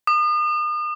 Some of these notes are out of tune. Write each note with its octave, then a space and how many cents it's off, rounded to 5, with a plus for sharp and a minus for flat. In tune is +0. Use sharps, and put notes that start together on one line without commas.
D#6 -40